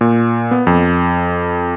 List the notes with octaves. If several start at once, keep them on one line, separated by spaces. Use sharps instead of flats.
A#2
B3
F2